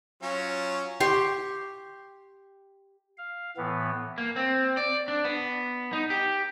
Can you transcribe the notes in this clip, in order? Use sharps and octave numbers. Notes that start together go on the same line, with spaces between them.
F#3 C#4 F4
G4 C6 C#6
F5
A2 E3 B3
A#3
C4
D5
D4
B3
D#4
G4